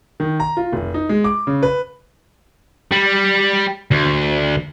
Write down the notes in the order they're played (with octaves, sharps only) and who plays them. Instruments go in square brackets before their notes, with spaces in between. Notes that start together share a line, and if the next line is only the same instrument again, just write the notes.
[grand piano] D#3
A#5
F4
F1
D#4
G#3
D6
C#3
B4
[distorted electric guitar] G3
D2